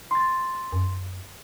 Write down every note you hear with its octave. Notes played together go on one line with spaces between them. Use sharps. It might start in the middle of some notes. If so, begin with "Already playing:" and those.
C6 A6
F#2